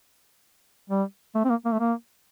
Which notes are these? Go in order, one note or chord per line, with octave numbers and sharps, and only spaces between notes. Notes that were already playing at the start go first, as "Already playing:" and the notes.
G3
A3
C4
A#3
A#3
A3
A#3